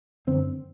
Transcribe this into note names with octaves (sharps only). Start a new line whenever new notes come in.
F#2 D3 C4